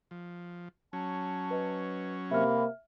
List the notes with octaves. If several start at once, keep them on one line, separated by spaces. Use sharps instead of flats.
F3
F#3 C#4 A5
B4 D#5
C3 A#3 E5 B5 F6